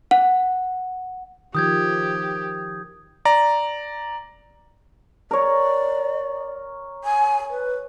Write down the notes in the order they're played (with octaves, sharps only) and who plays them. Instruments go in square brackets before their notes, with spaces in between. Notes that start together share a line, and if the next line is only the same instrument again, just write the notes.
[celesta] F#5
[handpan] D#3 F3 [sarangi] G4 [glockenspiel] D#6 G6 G#6
[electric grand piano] D5 A#5
[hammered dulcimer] A#4 C#5 [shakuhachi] D5
[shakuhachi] G#5
B4